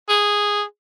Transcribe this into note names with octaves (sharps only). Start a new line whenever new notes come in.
G#4